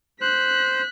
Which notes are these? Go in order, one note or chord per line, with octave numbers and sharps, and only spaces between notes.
C5 F#6 B6